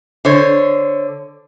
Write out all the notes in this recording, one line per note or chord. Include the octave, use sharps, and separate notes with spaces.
D3 C5 C#5